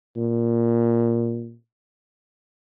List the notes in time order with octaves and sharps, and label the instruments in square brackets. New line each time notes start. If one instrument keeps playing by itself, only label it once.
[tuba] A#2